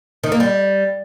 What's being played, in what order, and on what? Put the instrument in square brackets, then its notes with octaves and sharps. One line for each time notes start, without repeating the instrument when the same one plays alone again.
[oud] D#3
A#3
G3